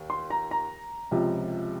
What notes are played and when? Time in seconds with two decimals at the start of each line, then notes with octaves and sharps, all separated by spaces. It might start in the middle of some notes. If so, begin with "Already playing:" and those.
Already playing: D#2
0.10 C6
0.30 A#5
0.51 A#5
1.11 C#2 C3 F3